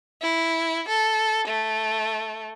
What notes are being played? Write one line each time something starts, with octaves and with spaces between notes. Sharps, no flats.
E4
A4
A3